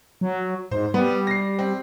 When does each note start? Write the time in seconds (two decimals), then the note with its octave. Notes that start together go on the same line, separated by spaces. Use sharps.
0.21 F#3
0.71 G#2 C5
0.94 G3 B3
1.27 A#6 C7
1.59 C4